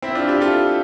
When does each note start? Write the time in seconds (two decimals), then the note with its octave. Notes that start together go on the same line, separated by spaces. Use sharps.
0.02 C4 E4
0.15 D4 F4
0.28 E4 G4
0.41 F4 A4